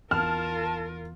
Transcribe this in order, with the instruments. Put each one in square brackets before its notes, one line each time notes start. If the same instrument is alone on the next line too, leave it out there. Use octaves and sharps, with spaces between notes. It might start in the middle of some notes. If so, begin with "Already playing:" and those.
[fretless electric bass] E2 [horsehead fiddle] F4 A#4 [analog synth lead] A5 [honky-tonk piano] F6